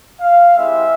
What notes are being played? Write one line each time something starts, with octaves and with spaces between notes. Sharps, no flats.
F5
G#3 C4 E4 G4 E5